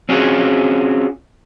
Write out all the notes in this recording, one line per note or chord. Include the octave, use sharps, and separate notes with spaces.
C4 C#4 F4 F#4 G#4